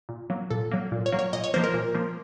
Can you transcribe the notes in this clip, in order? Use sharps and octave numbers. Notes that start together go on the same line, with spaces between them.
A#2
F#3 A#3
A#2 A4
F#3 A#3
A#2
C#5
F#3 A#3
C#5
A#2 D#5
C#5
F3 A#3 C5
A#4
A#2
F3 A#3